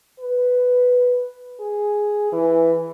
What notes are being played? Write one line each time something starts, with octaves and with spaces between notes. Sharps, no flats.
B4
G#4
E3